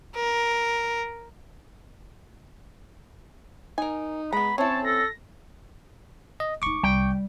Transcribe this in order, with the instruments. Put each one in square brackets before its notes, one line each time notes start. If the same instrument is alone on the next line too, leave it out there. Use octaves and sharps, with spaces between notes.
[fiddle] A#4
[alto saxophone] D#4 [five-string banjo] A#4 G#5
[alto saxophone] G#3 [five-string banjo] B3 A#5 [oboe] B5
[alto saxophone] C4 [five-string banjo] C#4 E4 [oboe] C#5 [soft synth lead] A5
[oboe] A4 [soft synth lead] A#6
[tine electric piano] D#5
[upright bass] E1 D#4 [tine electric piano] C#6 D6
[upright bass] C2 [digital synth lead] G3 [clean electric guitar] G5